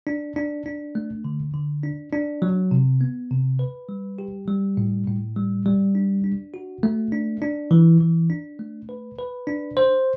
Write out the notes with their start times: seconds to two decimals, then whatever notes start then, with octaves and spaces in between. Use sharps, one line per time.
0.07 D4
0.36 D4
0.66 D4
0.95 A3
1.25 D3
1.54 D3
1.84 D4
2.13 D4
2.42 F#3
2.71 C3
3.01 B3
3.31 C3
3.59 B4
3.89 G3
4.19 G4
4.48 G3
4.77 A2
5.07 A2
5.36 G3
5.66 G3
5.95 D4
6.24 D4
6.54 F#4
6.83 A3
7.12 D4
7.42 D4
7.71 E3
8.00 E3
8.30 D4
8.59 A3
8.89 B4
9.18 B4
9.47 D4
9.77 C5